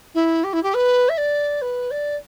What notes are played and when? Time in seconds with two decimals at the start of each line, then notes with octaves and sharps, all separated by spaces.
0.15 E4
0.44 G4
0.53 E4
0.63 G4
0.74 B4
1.09 E5
1.18 D5
1.62 B4
1.91 D5